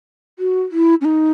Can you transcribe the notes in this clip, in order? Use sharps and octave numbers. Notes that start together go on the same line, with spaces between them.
F#4
E4
C#4
D#4